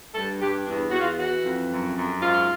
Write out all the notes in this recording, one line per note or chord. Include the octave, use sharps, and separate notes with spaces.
G2 A4
G2 G4
E2 D4
E2 F#4
F4
E3 F#4
F2
F#2
F#2
G#2 F4